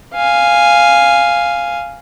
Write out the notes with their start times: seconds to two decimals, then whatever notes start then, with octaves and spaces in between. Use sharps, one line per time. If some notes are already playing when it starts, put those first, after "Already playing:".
0.15 F5 G#5